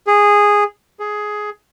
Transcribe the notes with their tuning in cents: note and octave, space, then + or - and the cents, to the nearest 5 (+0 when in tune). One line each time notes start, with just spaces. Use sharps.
G#4 -10
G#4 +10